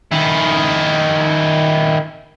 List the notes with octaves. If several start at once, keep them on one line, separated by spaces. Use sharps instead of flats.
D#3 E4